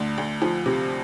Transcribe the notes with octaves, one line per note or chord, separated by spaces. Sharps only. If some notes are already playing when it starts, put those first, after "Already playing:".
Already playing: D2 D3
D2
F3
C3